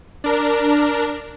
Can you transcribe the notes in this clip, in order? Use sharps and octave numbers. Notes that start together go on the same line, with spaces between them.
D4 A#4